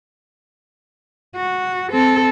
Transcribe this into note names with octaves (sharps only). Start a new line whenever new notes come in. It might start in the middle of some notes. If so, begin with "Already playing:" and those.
F#4
C4 A4